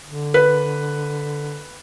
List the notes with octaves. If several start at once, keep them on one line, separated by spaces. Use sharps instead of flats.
D3
B4